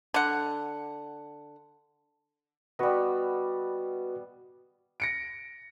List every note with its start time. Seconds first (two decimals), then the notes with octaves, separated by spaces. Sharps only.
0.14 D3 F#5
2.79 G3 B3 F#4 B4 D#5
5.00 A#6 C#7 D7